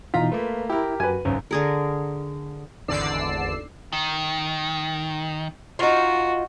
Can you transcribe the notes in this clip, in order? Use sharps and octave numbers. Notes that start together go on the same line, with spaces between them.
B2 E3 D#4 F4 A#5 B6
A3 A#3 B4
E4 G4 A#4
F#2 F#4 B4 G#5
G#1 C#2 F#2 C#4
D3 G#4 A#4
G#1 E2 D3 D5 E6 C7
D#3
D#4 F4 F#4